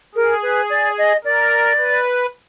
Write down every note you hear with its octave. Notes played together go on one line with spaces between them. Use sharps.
G#4 A#4
B4
D5
D#5
A#4 D5
B4